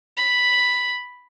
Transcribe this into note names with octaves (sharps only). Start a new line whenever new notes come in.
B5